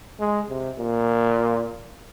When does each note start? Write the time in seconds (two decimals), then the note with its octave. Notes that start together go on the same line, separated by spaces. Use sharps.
0.20 G#3
0.50 C3
0.79 A#2